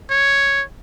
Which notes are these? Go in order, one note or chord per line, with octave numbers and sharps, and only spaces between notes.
C#5